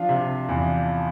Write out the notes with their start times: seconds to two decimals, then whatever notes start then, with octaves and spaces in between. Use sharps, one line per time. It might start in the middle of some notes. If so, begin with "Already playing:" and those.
Already playing: F3 D4 F4
0.09 C3
0.49 E2